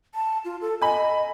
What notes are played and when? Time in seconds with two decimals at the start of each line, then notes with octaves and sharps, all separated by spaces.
0.15 A5
0.45 F4
0.61 A4
0.82 D#5 G#5 B5